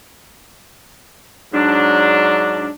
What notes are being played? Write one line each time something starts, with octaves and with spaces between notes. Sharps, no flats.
G#2 F#3 D4